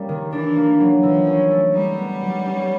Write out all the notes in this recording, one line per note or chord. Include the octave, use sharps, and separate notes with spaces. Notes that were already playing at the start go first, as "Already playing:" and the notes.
Already playing: G3 A#3 C#4
D#3
E3 D4
A#3
F#3
E3 F3
C#4
A3
G3 D#4
B3
F#3
C#4